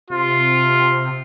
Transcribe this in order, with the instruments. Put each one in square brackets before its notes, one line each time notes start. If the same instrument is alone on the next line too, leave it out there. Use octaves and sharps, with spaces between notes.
[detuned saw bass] C3 [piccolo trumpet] F4